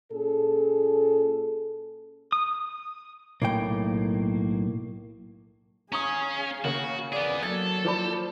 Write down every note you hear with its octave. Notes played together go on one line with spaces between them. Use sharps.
A#2 C#4 G#4 A4
D#6
B1 A2 A#3 G5
C#4 G#4 F5 A#5 C#6 D#6
C#3 A#3 F#4
B3 G#4 D5
F#3 A#3 A4 G#6 A6
F3 D5 B5